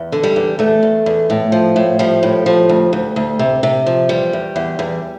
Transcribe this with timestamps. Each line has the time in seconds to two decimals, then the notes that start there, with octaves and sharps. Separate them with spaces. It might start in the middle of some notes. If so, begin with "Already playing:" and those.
Already playing: E2
0.12 D3
0.23 G3
0.36 E2
0.59 E2 A3
0.83 E2
1.06 E2
1.30 A2
1.52 F3
1.76 A2
1.99 F3 G3
2.23 A2
2.46 F3
2.69 D2
2.93 D2
3.16 D2
3.39 C3
3.63 C3
3.86 F3
4.09 E2 G3
4.33 E2
4.56 E2
4.79 E2